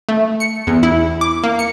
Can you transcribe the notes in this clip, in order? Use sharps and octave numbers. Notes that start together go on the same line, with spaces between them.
A3
C#7
E2
E4
D6
A#3
C#7